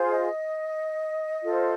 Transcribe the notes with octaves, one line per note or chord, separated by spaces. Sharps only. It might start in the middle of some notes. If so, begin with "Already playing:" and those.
Already playing: F4 G#4 C5
D#5
F4 A4 C5